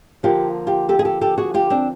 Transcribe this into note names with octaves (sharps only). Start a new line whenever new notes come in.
D3 F3 A#3 F4 G4
F4 G4
G4 A4
G#4
G4 A4
G4 A4
F#4 G#4
F4 G4
C4 D4